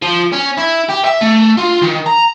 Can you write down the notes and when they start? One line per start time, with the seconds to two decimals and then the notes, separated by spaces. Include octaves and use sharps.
0.02 F3
0.33 C#4
0.58 E4
0.89 G4
1.05 E5
1.22 A3
1.58 F4
1.82 D#3
2.06 A#5